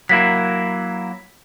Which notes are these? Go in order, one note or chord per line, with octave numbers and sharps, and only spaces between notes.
F#3 A#3 E4 B6